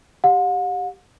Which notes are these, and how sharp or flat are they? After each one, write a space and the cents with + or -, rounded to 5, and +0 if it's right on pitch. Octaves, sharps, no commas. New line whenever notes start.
G4 +0 F#5 -45